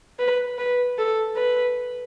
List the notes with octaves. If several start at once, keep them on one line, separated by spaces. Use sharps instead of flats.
B4
B4
A4
B4